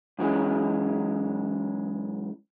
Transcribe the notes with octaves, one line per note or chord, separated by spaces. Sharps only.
F#2 E3 G#3 C#4